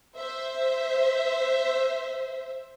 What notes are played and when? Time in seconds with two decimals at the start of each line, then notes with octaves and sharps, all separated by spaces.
0.15 C5 E5